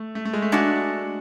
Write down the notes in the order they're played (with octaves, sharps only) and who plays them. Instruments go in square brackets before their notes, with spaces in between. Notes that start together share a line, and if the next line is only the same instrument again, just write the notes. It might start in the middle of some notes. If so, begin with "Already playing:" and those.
Already playing: [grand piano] A3
A3
A3
G#3
A3
[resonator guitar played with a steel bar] G#3 D4 F#4